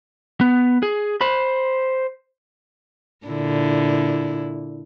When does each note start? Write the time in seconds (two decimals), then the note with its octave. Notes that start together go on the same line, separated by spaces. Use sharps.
0.41 B3
0.83 G#4
1.21 C5 B5
3.26 A#2 D3 E4